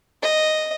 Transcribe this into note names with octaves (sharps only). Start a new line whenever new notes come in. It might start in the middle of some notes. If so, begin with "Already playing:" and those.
D#5